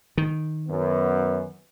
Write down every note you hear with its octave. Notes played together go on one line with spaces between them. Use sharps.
D#3
F#2 B3